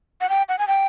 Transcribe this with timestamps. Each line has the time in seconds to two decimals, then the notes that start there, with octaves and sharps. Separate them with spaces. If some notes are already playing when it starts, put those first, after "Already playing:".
0.21 F#5
0.29 G5
0.49 F#5
0.59 G#5
0.68 G5